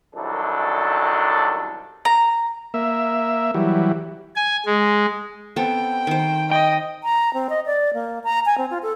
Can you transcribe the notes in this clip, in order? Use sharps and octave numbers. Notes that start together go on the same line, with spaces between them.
C2 F#2 D#3 D4 A4
A#5
A#3 E5
E3 F#3 G3
G#5
G#3
B3 C4 A4 G5
D#3 C5
D#5 G5
A#5
C4
D#5
D5
A#3
A#5
G#5
C4
F4
A4